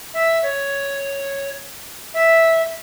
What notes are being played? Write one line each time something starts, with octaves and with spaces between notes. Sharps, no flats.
E5
C#5
E5